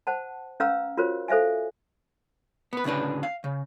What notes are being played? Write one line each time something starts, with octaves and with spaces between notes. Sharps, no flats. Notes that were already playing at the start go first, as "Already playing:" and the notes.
C5 F#5 A5
C#4 B4 F5 A#5 E6
F4 F#4 A#4 C5 C#5
A4 C5 E5 F5 G#5
B3 B4
D2 A2 C#3 D4 B4
F5
C#3